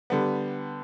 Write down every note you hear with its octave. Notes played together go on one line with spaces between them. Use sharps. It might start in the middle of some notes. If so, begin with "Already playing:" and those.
D3 G3 B3